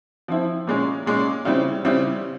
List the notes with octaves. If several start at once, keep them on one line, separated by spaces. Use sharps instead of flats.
F3 C4 E4
A#2 G#3 C#4
A#2 G#3 C#4
C#3 G3 C4 E4
C#3 G3 C4 E4